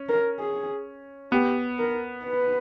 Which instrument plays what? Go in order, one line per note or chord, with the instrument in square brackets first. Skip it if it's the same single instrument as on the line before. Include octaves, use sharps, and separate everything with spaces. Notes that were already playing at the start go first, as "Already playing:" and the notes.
Already playing: [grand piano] C#4
[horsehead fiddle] A#4
G#4
[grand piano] B3 [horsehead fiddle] G4
[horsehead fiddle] A#4
B4